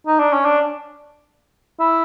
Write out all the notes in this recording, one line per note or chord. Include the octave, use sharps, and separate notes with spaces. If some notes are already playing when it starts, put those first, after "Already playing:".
D#4
D4
C#4
D4
E4